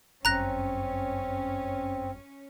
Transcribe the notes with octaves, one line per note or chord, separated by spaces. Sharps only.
G1 F#2 C4 C#4 A#5 F#6 A#6